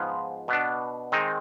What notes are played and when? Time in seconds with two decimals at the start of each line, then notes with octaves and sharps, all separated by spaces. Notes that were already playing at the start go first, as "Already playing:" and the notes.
Already playing: G#2 F3 B3 F4 G#4
0.48 B2 B3 D4
1.12 D#3 G#3 C4 D#4